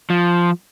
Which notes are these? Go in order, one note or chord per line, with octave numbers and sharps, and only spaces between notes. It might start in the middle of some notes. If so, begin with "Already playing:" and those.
F3